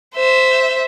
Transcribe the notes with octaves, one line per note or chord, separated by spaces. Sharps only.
C5 E5